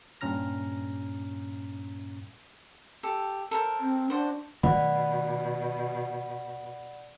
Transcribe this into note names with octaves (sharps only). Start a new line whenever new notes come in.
G2 A#2 C#4 A#5 F6 A#6
G4 A4
A4 A#4 C5
C4
D4 F#4 C5
B2 D#3 F#3 A3 D5 F#5 B5